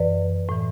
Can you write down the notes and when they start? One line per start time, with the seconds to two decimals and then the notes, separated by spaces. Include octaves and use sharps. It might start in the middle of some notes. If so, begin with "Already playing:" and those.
Already playing: F#2 E3 B4 D5
0.49 A2 E3